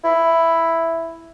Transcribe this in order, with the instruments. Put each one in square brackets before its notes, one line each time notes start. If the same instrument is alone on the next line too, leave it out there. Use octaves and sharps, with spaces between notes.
[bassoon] E4